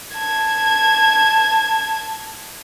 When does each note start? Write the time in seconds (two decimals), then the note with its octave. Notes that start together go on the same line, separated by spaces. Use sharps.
0.14 A5 G#6